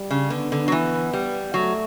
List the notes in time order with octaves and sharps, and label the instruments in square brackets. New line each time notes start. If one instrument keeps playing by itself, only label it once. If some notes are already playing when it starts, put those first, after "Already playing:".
Already playing: [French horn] G3
[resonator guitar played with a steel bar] C#3
[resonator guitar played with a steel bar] D3 [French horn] B3
[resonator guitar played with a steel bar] D3
F#3
E3
G3
[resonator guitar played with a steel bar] F#3 [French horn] A3